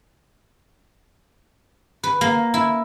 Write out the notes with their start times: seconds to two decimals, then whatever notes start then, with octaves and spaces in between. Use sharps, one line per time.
2.03 B4
2.21 A#3
2.54 E4